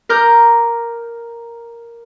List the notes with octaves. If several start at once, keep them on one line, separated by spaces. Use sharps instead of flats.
A#4 A#5 D6 F6 G6